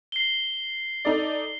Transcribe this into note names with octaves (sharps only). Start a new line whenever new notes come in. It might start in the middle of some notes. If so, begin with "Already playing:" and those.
C7 G7
D#4 A4 D5